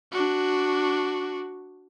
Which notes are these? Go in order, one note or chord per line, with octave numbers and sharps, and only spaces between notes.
D4 F#4